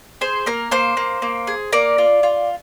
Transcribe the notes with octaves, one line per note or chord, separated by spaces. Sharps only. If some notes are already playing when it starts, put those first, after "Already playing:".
G#4 C5
A#3 A#4
A#3 C5
A#3
A#3
G#4
A#3 A#4 D5
F4
F4